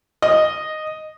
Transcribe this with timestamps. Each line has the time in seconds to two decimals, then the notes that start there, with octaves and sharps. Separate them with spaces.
0.22 D#5